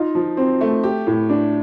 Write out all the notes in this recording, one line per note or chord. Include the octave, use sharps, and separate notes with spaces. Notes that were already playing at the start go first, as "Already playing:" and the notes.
Already playing: D#4 F4
F3
C4
A3
G4
A2
D4